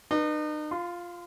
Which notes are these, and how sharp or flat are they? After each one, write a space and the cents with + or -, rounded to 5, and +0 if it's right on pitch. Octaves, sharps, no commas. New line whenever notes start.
D#4 -40 B4 -25
F4 +0 C6 -35